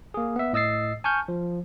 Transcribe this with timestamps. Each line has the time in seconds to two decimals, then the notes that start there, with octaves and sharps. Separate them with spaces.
0.14 A#3 G#4
0.36 B3 E5
0.53 A2 D#5 E6 A6 C7
1.04 G#5 A5 C#6 F6 G6
1.28 F3